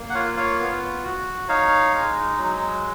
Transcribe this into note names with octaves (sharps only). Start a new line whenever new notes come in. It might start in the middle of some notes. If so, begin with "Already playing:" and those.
Already playing: A#3
F#5
F4 C#5 F5
C#5 F5
B3
F#4
D#4 C#5 F5
G#3
F#3